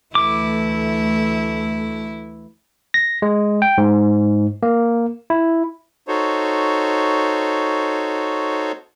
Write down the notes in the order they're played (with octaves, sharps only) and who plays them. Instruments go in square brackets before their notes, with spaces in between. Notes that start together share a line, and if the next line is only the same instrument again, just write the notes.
[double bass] D2 A3 [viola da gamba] E3 E4 [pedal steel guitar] D6
[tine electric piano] A#6
G#3
G5
G#2
A#3
E4
[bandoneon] D#4 F#4 A4 C5 C#5